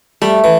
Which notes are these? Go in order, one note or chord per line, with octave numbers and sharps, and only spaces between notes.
G3 A3
E3